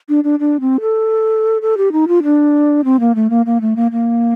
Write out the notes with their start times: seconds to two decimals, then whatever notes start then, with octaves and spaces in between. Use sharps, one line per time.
0.09 D4
0.24 D4
0.39 D4
0.60 C4
0.81 A4
1.62 A4
1.77 G4
1.92 D#4
2.08 F4
2.23 D4
2.84 C4
3.00 A#3
3.15 A3
3.30 A#3
3.46 A#3
3.61 A3
3.76 A#3
3.92 A#3